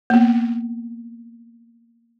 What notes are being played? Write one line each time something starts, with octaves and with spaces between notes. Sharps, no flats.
A#3 B3